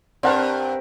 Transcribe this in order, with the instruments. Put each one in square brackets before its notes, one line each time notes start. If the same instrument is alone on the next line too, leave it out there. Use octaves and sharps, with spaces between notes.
[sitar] G2 [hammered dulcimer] C4 A#4 B4 [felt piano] D5 F#5 A5